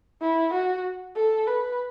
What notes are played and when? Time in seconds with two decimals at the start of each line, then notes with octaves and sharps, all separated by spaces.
0.21 E4
0.53 F#4
1.16 A4
1.47 B4